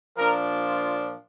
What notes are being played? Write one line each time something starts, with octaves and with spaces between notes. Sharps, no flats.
A#2 F3 D4 A#4
F4